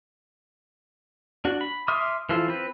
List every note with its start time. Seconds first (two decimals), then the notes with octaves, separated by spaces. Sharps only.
1.45 D4 F#4
1.61 B5
1.88 E5 C6 D6 D#6 F6
2.29 E3 F3 F4 A4
2.48 C4 B4